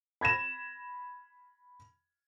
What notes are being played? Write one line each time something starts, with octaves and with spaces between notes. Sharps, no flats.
B5 G#6 A#6 E7